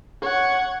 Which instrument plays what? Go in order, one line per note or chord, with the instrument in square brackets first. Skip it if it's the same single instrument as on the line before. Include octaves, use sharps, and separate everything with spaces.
[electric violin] C#5 F#5